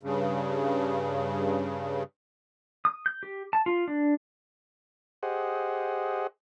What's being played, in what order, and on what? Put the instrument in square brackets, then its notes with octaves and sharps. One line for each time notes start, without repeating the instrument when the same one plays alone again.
[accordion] G2 C#3
[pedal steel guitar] D#6
G6
G4
A5
F4
D4
[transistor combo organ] G4 G#4 C5 D#5 F#5